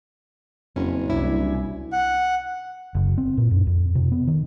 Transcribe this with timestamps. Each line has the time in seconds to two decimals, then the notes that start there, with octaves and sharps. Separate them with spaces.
0.76 F#1 F2 C4 C#4
1.10 C2 D4 E4 G#5
1.93 F#5
2.95 F#1
3.18 C4
3.37 A#2
3.51 F#2
3.67 F2
3.95 C3
4.12 B3
4.27 D#3